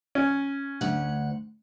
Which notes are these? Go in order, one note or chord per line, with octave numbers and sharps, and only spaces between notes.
C#4
D2 F#5